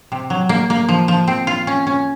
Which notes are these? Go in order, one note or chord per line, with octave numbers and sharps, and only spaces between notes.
C3
F#3
A#3
A#3
F3
F3
C4
F4
C#4
C#4